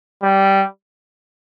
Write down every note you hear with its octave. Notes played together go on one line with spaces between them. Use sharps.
G3